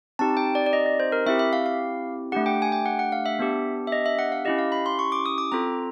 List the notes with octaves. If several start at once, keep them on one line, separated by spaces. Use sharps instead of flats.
C4 D#4 G4 A5
G5
D5
D5
D#5
D#5
C5
A#4
C4 E4 G4 E5
E5
F5
F5
A3 D4 G4 F#5
G5
G#5
G5
F#5
F#5
F5
E5
B3 D4 G4
E5
D#5
E5
F#5
F5
C#4 E4 G4 D#5
F5
B5
C6
C#6
D6
D#6
D6
C4 F4 A4 A#5